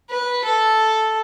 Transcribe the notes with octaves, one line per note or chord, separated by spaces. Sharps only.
B4
A4